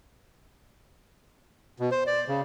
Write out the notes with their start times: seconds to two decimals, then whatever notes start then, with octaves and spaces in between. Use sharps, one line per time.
1.80 B2
1.91 C5
2.07 D5
2.28 C#3